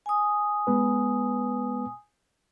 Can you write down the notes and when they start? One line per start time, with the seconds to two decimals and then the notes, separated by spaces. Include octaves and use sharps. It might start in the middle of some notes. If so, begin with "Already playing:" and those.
0.06 G#5 D#6
0.67 G#3 B3 B4